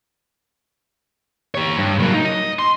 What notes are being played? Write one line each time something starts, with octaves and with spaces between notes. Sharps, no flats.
G4 C#5
G2
F#3 A#3
D#4
D#5
C6